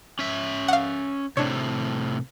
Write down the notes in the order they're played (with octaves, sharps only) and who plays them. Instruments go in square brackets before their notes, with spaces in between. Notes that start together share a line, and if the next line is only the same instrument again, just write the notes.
[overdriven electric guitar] C#4 E5
[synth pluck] F5 F#5
[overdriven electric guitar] A2 C3 [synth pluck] D4 C#5